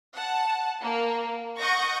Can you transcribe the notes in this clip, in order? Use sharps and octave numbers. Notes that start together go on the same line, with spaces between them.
F#5 A5
A#3
D#5 F#5 C#6 G6 A#6